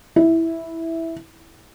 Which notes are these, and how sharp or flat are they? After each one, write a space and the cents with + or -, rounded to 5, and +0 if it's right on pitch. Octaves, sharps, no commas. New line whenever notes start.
E4 -5